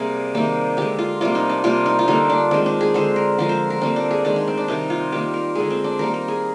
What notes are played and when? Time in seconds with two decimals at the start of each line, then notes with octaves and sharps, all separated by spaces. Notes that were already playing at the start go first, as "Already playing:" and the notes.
Already playing: C3 G3 A#3 G#4 A#4 C5
0.35 C3 D#3 G3 A#3
0.77 D3 G#3 G4
0.99 F4
1.21 C3 G3 A#3 F4
1.35 D#4
1.49 D4
1.64 C3 G3 A#3 F4
1.86 D#4
1.99 F4
2.08 D3 G3 A#3 D#4
2.30 D4
2.51 D#3 G#3 C4
2.66 D4
2.81 G#4
2.94 D3 G#3 C5
3.16 A#4
3.38 D3 F3 G#3 A#4
3.49 C5
3.70 A#4
3.81 D3 G3 A#3 C4
3.96 D4
4.11 G#4
4.25 D#3 G#3 D4
4.36 D#4
4.48 C4
4.57 D4
4.68 C3 D#3 G3 D#4
4.90 F4
5.12 D#3 G3 A#3 G4
5.34 A#4
5.55 D3 G#3 G#4
5.70 C4
5.84 D4
5.99 D#3 G3 A#3 A#4
6.14 A#4
6.28 G#4